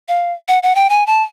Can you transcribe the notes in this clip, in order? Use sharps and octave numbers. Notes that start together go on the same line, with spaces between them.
F5
F#5
F#5
G5
G#5
A5